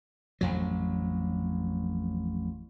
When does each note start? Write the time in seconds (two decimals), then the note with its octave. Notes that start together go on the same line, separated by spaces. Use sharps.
0.41 A1 F2 F#3